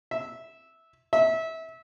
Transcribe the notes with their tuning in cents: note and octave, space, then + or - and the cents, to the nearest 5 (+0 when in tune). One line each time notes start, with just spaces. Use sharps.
E5 -10
E5 -25